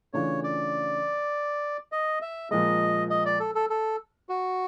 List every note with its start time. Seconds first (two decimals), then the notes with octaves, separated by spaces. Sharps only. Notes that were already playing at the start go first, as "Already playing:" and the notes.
0.13 C#3 E3 A3 D4 F4 C#5
0.44 D5
1.92 D#5
2.22 E5
2.51 A#2 F3 G#3 D#5
3.10 D#5
3.25 D5
3.40 A4
3.55 A4
3.70 A4
4.29 F#4